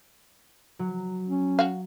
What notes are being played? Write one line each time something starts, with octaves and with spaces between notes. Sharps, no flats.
F#3
C#4
F#4 F5